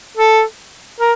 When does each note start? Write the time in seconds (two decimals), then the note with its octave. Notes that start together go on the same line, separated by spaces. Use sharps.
0.17 A4
1.00 A#4